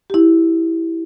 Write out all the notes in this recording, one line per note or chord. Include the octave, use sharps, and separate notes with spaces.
E4 G4